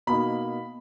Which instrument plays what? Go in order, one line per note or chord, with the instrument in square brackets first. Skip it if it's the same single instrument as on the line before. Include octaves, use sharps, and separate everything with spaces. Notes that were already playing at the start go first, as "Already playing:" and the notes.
[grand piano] B2 A#3 D#4 B5